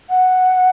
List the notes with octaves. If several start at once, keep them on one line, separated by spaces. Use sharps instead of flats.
F#5